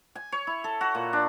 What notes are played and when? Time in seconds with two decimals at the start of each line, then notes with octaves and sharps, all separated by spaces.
0.15 G#5
0.32 C#5
0.47 E4
0.64 A4
0.81 F#4
0.95 A#2
1.13 D4